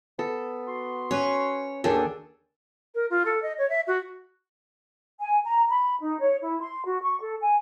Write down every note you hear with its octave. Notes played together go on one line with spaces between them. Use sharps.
B3 A4
F#4 C6
C#4 B4 C#5
D#2 D4 F#4 G#4 A4 C#5 G5
A#4
F4
A4
D#5
C#5
E5
F#4
G#5
A#5
B5
D#4
C#5
E4
C6
F#4
C#6
A4
G#5